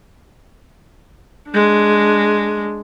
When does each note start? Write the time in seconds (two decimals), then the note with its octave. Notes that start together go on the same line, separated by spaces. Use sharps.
1.51 G#3 D4